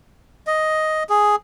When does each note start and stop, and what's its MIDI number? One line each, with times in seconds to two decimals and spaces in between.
0.47 1.03 75
1.09 1.36 68